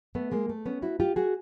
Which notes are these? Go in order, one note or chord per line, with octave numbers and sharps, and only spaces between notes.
A3 B3
G#3 A#3
A3
B3 C#4
E4 F#4
F4 G4
F#4 G#4